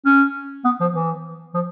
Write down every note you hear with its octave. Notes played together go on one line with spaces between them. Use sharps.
C#4
B3
F3
E3
F3